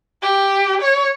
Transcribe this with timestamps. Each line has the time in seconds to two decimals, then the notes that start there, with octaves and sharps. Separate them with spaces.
0.22 G4
0.82 C#5